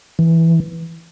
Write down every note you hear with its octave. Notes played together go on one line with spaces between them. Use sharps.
E3